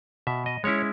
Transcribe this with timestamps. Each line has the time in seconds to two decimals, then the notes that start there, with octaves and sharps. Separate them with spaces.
0.27 B2 E5
0.46 D#5
0.64 G#3 C#4 E4 C#5